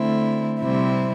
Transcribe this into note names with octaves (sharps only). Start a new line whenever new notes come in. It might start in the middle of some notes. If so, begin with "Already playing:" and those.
Already playing: D3 A3 C4 E4
C3 G3 C4 E4